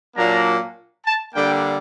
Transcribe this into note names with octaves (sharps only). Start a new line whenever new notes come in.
A#2 F#3 A#3 D4 A#5
A5
D3 G3 A#3 D4 G5